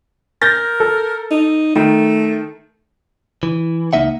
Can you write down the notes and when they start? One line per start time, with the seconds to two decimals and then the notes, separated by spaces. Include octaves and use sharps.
0.42 A#4 G6 A6 A#6
0.80 A4
1.31 D#4
1.76 D#3 A3
3.43 E3
3.93 C#2 A#3 D#4 E5 F#5